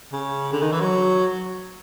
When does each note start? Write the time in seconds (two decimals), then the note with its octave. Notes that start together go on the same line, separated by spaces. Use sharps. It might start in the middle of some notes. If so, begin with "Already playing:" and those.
0.12 C#3
0.52 D3
0.62 D#3
0.72 E3
0.81 F#3